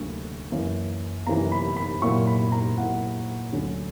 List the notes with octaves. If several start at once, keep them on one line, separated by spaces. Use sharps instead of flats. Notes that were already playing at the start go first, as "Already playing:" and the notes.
Already playing: D2 D3 F#3 A#3 C#6
F#2 E3 A#3
F#2 E3 A#3 A#5
B5
B5
A#2 F#3 A#3 E4 C#6
B5
A#5
A#2 F#3 A#3 E4 F#5
D2 D3 F#3 C#4